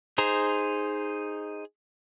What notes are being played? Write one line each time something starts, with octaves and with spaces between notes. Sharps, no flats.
D#4 G#4 C5 A#5